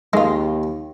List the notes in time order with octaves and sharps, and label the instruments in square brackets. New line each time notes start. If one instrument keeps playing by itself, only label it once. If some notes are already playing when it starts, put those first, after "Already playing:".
[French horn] D#2 [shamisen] D#3 F4 [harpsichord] G#3